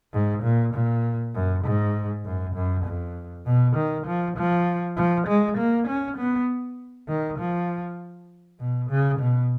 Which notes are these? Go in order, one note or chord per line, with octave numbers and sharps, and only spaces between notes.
G#2
A#2
A#2
F#2
G#2
F#2
F#2
F2
B2
D#3
F3
F3
F3
G#3
A#3
C#4
B3
D#3
F3
B2
C#3
B2